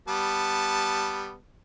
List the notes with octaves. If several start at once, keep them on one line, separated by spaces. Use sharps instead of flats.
G3 B3 A5